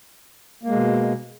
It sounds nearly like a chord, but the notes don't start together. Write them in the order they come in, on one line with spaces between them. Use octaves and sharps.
A#3 G#3 B2